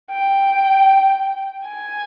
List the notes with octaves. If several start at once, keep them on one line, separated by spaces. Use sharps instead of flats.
G5
G#5